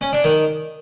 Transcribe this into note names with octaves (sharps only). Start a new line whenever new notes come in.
C#4
D4
D#3